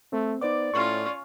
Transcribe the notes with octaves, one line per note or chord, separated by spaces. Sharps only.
A3 C4
B3 D#4 C5 D5 D6
A2 C#4 F4 C#6